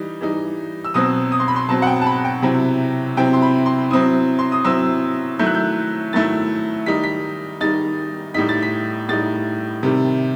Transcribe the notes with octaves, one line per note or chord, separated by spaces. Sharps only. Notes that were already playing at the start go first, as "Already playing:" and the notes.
Already playing: E3 G3 D#4
E3 G3 D#4
E6
B2 F#3 C4 D#6
D#6
C6
B5
C6
B2 F#3 C4 A5
F#5
G5
A5
B5
G5
C3 F#3 C4 E4 G5
C3 F#3 C4 E4 G5
C6
B5
C6
F#3 C4 E4 D#6
C6
D#6
F#3 C4 E4 E6
D#3 F#3 A3 E4 G6
F#6
G6
D#3 F#3 A3 E4 A6
D#3 G3 D#4 B6
B6
D#3 G3 D#4 A6
A2 G3 D#4 B6
A6
B6
A2 G3 D#4 A6
C3 D#3 G3